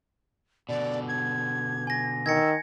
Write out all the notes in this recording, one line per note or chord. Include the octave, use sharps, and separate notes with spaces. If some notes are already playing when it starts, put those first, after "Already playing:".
B2 D3 D5
G#6
G#5 A#6
D#3 E6 G#6 A#6 C#7